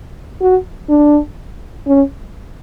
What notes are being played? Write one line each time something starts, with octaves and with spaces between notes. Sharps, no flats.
F#4
D4
C#4